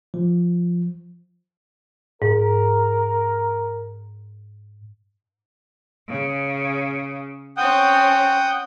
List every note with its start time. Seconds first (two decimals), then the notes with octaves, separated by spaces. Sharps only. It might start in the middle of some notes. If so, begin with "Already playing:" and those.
0.14 F3
2.22 G#2 A#4
6.07 C#3
7.57 C4 C#4 F#5 G5 D#6